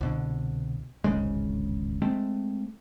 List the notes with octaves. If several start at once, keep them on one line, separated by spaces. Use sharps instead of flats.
C2 B2 D3
D1 G#1 C#3 G#3
G#3 A3 C4